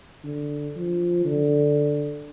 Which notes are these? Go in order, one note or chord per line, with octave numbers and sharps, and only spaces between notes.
D3
F3
D3